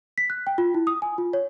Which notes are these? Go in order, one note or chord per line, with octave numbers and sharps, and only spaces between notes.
B6
F#6
G5
F4
E4
D#6
G#5
F4
C#5